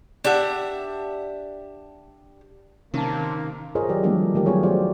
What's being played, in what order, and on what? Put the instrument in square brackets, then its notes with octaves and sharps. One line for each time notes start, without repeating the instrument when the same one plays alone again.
[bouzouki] D4 G4 E5 F#5
[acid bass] C3 [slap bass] D#3 [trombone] A#3 [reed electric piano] C#4 A5
[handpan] F4 G#4 A#4 C5 C#5 D#5
D#3 F#3 G4 D5
E3 F3 G3 A3 A#3 D4
D3 D#3 A3 D#4 G4 A#4
F#3 B3 F4 G#4 C#5
F4 G4 G#4 C5 D5